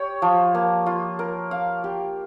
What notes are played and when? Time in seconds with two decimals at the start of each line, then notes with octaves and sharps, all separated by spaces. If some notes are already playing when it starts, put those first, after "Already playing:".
Already playing: G4 C#5
0.22 F3
0.55 A#3
0.86 F4
1.19 A#4
1.51 F5
1.84 G4